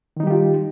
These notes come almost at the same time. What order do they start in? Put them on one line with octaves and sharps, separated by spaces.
D#3 D#4 G3 G4 F4